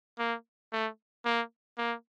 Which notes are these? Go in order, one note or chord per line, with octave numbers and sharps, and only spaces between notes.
A#3
A3
A#3
A#3